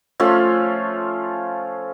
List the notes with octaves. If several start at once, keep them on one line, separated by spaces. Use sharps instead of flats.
F3 A3 C#4 F4